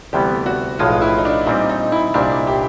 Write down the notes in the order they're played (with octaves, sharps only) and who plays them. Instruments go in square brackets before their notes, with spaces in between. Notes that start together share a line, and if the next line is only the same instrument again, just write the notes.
[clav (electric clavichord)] D2 C3 E3 G3 B3 [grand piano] G4
[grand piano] F#4
[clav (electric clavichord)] B1 A2 F3 G#3 [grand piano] F4
[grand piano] E4
D#4
D4
[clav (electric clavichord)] A#2 G3 C4 [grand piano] D#4
[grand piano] D#4
E4
[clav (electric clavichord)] C2 A#2 G3 [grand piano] D4
[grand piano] G4